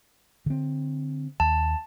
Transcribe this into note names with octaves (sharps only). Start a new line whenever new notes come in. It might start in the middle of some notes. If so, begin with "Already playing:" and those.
D3 C4
D#2 A5